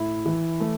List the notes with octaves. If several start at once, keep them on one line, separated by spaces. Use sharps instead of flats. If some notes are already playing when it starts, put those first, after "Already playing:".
Already playing: A2 E4
E3
A3